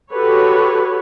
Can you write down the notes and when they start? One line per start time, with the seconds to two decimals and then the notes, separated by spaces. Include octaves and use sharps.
0.12 F#4 G4 A4 B4 C#5